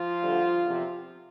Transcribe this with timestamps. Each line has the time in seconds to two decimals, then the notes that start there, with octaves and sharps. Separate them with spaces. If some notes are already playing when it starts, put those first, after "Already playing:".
Already playing: F3 F4
0.21 D2 D3 G3
0.65 E2 C3 F3